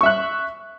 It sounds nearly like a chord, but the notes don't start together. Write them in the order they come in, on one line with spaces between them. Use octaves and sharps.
C#6 E5 F#6